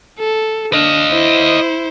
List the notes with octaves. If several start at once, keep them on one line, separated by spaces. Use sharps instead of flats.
A4
D4 D#5 F5
E4 C5